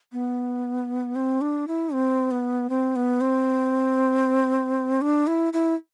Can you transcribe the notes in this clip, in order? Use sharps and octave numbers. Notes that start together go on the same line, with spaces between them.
B3
C4
D4
E4
C4
B3
C4
B3
C4
D4
E4
E4